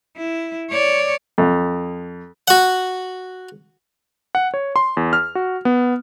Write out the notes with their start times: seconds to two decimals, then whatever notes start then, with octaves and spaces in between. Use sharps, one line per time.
0.17 E4
0.70 C#5 D5
1.38 F2
2.48 F#4 F#5
4.35 F#5
4.54 C#5
4.76 C6
4.97 E2
5.13 F6
5.35 F#4
5.65 B3